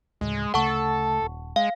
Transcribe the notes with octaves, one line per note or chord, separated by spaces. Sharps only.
D2 A2 C#3 G#3
D2 C#3 A3 A4 F#5 A5 C#6
D#1
G#3 F5